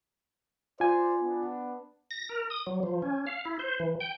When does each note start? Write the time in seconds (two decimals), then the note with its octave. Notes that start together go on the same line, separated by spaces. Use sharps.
0.80 F4 C5 D5 G#5
1.21 B3 D4
2.11 A#6
2.29 A#4
2.50 D#6
2.67 F#3
2.83 F3
3.02 C#4
3.27 F5
3.45 E4
3.59 C5
3.80 E3
4.00 G5